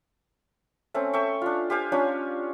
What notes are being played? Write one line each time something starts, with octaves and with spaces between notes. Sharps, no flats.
A3 C4 C#4
A3 E5 G5 C#6
D4 F4
G4 C5 F5 G#5
C#4 D4 F4 C#5